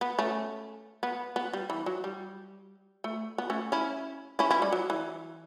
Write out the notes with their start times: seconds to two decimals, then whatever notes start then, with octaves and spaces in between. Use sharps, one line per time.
0.01 B3
0.19 A3 C#4
1.03 B3
1.36 B3
1.53 G3
1.70 E3
1.86 F#3
2.04 G3
3.04 A3
3.38 B3
3.50 A3 C#4
3.72 C#4 E4
4.39 C#4 E4
4.51 C#4 E4
4.62 G3
4.73 F#3
4.90 E3